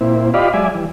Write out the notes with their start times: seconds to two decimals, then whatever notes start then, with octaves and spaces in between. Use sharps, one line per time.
0.01 A#2 C4 E4
0.34 F4 G4 D5 D#5 F5 B5
0.53 F#3 G#3 D5 E5 G#5
0.75 E3 G3